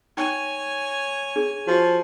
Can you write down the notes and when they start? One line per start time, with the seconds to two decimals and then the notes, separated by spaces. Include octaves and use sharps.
0.17 D#4 C#5 G5 G#5 C#6
1.36 D4 G#4
1.67 F3 F#4 G4